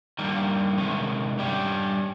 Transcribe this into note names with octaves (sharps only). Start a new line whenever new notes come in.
G2 D#3 G3 A#3
C3 D#3 G#3 C#4
G2 G3 C#4 G4